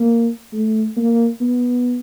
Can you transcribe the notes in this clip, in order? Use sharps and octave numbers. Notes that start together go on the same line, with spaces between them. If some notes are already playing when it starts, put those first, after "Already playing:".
Already playing: A#3
A3
A#3
B3